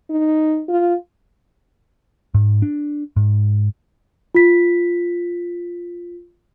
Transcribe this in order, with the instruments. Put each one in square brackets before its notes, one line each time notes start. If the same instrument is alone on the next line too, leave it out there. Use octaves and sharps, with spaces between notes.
[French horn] D#4
F4
[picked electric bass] G#2
D4
G#2
[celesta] F4 B6